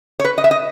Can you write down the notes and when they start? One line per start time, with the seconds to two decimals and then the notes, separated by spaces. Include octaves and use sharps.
0.20 C#5
0.24 B4
0.38 D#5
0.44 E5
0.51 D#5